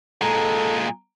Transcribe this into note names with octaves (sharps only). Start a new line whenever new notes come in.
A#2 G#3 A4 A#5